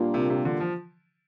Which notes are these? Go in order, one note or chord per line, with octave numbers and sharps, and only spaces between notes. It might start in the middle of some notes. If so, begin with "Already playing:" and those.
Already playing: A#2 G3 A#3 D4 F4
C3
C3
D3
F3